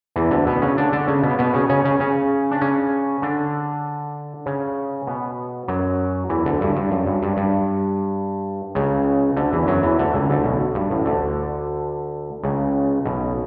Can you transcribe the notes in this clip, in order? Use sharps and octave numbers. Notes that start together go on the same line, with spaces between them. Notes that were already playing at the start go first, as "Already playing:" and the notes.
E2 E3
D2 D3
B2 B3
C#3 C#4
D3 D4
D3 D4
C#3 C#4
B2 B3
B2 B3
C#3 C#4
C#3 C#4
C#3 C#4
C#3 C#4
D4
C#3 C#4
D3 D4
C#3 C#4
B2 B3
F#2 F#3
E2 E3
D2 D3
G2
G2
F#2
G2
G2
G2
C#2 C#3
D2 D3
E2 E3
F#2 F#3
E2 E3
D2 D3
C#2 C#3
D2 D3
B1 B2
G2
A1 A2
D2 D3
C#2 C#3
B1 B2